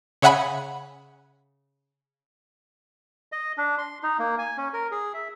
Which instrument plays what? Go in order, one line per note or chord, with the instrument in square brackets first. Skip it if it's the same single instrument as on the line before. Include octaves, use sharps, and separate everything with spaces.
[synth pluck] C#3 C#5 E5 F#5 G#5 B5
[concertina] D#5
D4
C6
D#4
A#3
G#5
C#4
A#4
G#4
E5